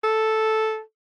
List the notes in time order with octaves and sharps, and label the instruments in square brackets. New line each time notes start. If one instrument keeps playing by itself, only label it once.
[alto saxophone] A4